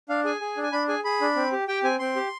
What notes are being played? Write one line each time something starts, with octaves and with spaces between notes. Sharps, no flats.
D4 F5
G#4 G#5
G#4
D4
G#5
D4 B5
G#4 G#5
G#4 B5
D4
C4
G4
G4 G5
C4 G#5
C4 C6
G4